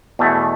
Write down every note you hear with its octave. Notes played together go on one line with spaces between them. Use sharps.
E2 B2 A3